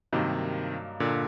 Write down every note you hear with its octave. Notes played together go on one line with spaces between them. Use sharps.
G2 C3 D#3 F#3 A#3 D#4
A#2 D3